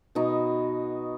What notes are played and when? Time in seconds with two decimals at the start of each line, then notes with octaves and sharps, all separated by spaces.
0.15 B2 B3 D#4 F#4